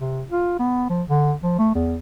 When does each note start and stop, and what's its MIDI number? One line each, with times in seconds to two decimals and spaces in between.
0.01 0.23 48
0.30 0.58 65
0.59 0.88 59
0.90 1.03 53
1.09 1.34 50
1.43 1.55 53
1.58 1.71 57
1.75 1.97 40